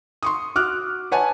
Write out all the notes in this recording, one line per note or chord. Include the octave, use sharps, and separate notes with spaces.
C6 C#6 D#6
F#4 D6 F6 F#6
B4 C#5 F#5 G#5 A5